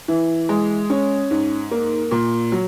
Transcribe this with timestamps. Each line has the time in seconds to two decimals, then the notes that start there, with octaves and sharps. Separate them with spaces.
0.08 E3
0.49 G#3
0.90 C#4
1.31 G#2
1.71 A#3
2.11 A#2
2.52 F#3